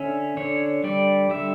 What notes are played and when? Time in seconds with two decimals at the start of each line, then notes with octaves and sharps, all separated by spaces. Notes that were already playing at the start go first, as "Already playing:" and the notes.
Already playing: D3 C#4 E5
0.37 D3 C#5
0.84 G3 D5
1.30 D3 E5